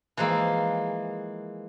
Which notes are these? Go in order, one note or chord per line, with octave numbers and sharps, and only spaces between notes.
E3 F3 G#3 A#3 E4